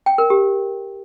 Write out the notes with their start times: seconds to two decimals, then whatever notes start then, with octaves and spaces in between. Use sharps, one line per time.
0.06 G5
0.18 A#4
0.30 G4